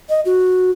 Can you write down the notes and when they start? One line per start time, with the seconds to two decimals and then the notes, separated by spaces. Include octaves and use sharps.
0.09 D#5
0.25 F#4